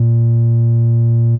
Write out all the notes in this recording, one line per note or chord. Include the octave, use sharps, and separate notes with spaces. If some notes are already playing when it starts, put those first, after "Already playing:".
Already playing: A#2